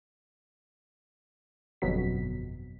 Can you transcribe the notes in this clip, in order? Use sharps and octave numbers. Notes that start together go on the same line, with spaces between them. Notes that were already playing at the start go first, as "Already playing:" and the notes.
G1 F2 B2 F#3 B6